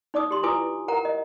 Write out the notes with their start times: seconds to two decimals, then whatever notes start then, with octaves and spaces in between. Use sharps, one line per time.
0.14 D#4 D5 D6 D#6
0.31 G4 C6
0.43 E4 F4 B4 G#5 D6 D#6
0.88 A#4 F#5 A#5
1.05 D#5